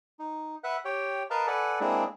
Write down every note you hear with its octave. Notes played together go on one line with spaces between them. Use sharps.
D#4
B4 E5 F#5 F#6
G4 C#5 G5
A#4 B4 D#5 F5 A5 A#5
A4 B4 D5 F#5 G#5
G#3 A#3 C4 D4 E4 G#4